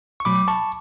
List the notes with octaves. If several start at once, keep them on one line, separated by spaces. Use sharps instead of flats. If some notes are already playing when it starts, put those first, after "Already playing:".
C#6
B2 F#3 A3 B5 D6
A5 C#6